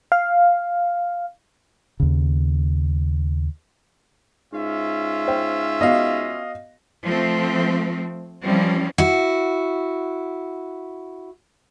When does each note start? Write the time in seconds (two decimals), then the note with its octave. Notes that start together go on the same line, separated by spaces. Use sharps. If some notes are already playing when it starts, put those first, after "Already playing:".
0.12 F5
2.00 D#2 C#3
4.53 G#2 C#4 F4 E5
5.28 C5 G5
5.81 B3 F#4 D#5 F5
7.04 F3 A3 C4
8.42 E3 F3 G3 C4 C#4
8.98 E4 F#4